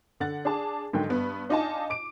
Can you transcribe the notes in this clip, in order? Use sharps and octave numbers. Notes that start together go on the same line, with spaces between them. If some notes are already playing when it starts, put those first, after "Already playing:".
D3 F#5 A6
D4 G#4 A5
G#2 D3 D#3 F#3 G5
G2 B3
D4 D#4 F4 D#5 G#5 A5
D6 D7